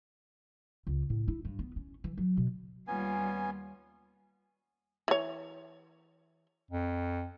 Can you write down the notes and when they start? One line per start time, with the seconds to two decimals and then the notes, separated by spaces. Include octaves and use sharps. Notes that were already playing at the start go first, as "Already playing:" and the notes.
0.87 C#2
1.10 A2
1.28 E4
1.45 G2
1.59 B3
1.76 C#4
2.04 E3
2.18 F#3
2.37 B2
2.87 D#2 G3 B3 C#4 F4 G#5
5.08 E3 C#5
6.71 F2